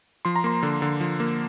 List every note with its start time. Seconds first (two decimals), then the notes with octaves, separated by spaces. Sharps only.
0.25 F3 C6
0.36 A#5
0.44 A#3 C6
0.63 D3
0.82 D3
1.00 F3
1.20 A#3